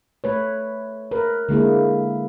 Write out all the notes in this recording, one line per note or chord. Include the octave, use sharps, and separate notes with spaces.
A3 B4 C#5
A#4 B4
D3 G#3 A#3 E4